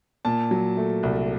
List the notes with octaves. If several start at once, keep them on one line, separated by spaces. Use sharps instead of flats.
A#2 A5
F#3
A3
C2